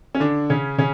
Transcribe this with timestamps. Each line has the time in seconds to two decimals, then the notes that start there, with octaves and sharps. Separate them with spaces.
0.15 C#4
0.20 D3 D4
0.50 C#3 C#4
0.78 C#3 C#4